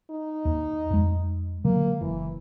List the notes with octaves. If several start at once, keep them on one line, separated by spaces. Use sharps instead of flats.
D#4
D#2
F2 G#3
D3 F#3 G#3 A#3
F#1 E3